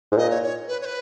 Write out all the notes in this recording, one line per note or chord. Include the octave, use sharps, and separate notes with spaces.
G#2
A#2 D#5
C#5
C#5
B4
C#5
B4